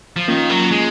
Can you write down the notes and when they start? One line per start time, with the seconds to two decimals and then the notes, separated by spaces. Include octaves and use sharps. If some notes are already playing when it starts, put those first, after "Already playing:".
0.16 F3
0.28 D#3 A#3 C#4 F4
0.49 F#3
0.71 G#3